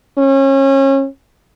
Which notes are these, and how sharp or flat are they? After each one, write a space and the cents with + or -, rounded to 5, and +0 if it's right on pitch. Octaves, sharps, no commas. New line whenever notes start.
C#4 -30